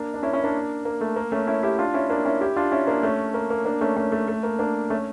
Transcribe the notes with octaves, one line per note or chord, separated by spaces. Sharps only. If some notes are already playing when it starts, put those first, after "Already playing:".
Already playing: A#3 D4
D4
C#4 E4
C#4 E4
A#3 D4
A#3
A3
A#3
A3 C#4
C#4 E4
E4 G4
D4 F4
C#4 E4
A#3 D4
C#4 E4
E4 G4
D4 F4
C#4 E4
A#3 D4
A3 C#4
A#3
A#3
A#3 D4
A3 C#4
A3 C#4
A3
A3
A#3
A#3 D4
A3 C#4